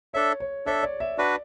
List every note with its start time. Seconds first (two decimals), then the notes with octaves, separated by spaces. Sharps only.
0.14 D4 A4 C#5 E5
0.40 C#5
0.66 D4 A4 C#5 E5
0.83 D5
1.00 E5
1.18 D4 F#4 B4 D5